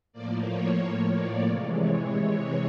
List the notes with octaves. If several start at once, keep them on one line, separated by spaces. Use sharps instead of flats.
A2 F3 A#3 D5
C#5
D5
C3 E3 G#3
C#5